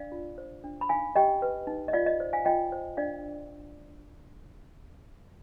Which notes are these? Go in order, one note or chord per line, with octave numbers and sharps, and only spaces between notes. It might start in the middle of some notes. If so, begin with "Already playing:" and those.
Already playing: D4 D5 F5
F4
C5
D4
B5
D#4 F5 G#5
G4 D#5 G5
B4
D#4
D#5
F4 D5 F5
D#5
C5
F5 G#5
F4 D#5 G5
C5
D4 D5 F5